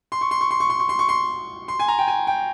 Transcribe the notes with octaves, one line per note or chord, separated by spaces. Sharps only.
C6
C#6
C6
C#6
C6
C#6
C6
C#6
C6
C#6
C6
C6
G#5
A#5
G5
G#5
G5